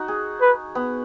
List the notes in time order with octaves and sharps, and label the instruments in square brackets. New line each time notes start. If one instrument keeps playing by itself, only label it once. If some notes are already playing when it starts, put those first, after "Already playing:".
Already playing: [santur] D#4 F#4
G#4
[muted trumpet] B4
[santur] B3